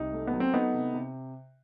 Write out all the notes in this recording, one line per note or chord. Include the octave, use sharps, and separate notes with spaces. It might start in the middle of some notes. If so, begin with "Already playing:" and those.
Already playing: C2 D#4
A3
B3
F#3
C4
A3 B3 D#4
C3
C3